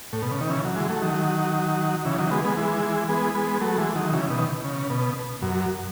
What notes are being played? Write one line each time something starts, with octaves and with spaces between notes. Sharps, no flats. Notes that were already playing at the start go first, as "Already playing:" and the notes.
A2
B2
C#3
D#3
C#3 E3
F#3
E3 G#3
F#3 A3
D#3 F#3
C#3 E3
D#3 F#3
G#3 B3
G#3 B3
E3 G#3
G#3 B3
G#3 B3
F#3 A3
E3 G#3
D#3 F#3
C#3 E3
B2 D#3
C#3
B2
F#2